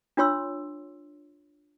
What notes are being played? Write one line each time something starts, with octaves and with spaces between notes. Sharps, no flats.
D4 F4 C#5 C6 E6